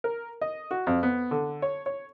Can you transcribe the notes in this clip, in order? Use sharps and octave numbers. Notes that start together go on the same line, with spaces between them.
A#4
D#5
F#4
F2
B3
D3
C#5
C#5